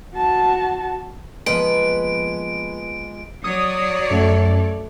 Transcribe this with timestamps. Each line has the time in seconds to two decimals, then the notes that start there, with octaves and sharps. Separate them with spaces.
0.14 F#4 A5
1.46 F3 G#3 A#3 B3 B4 D7
3.44 F#3 C#5 D5 D#6
4.11 F#2 A3